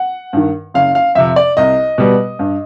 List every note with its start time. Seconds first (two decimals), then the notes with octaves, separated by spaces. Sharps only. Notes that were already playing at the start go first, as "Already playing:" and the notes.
Already playing: F#5
0.33 G2 D#3
0.74 F#1 F5
0.95 F5
1.15 F2 C3 E5
1.36 D5
1.57 C2 D#5
1.98 B2 G3 B3
2.39 G2